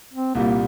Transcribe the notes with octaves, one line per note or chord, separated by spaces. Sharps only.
C4
C2 A#2 G3 A#3